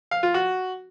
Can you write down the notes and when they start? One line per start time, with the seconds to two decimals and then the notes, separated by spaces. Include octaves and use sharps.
0.11 F5
0.23 F4
0.34 F#4